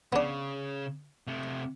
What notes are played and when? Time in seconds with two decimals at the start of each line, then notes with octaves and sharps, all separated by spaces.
0.13 C#3 B3 D4
1.27 C3 A3